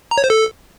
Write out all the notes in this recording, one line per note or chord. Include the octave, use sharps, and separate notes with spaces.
A#5
C#5
C5
A4